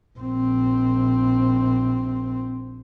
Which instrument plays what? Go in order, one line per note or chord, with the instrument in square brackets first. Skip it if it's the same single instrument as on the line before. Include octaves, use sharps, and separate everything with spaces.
[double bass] A#1 C4